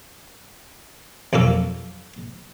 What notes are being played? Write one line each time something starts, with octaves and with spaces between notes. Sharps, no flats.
B1 F2 A#3 A4